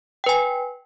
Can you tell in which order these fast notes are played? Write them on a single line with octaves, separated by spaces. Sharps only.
G5 B4 G#5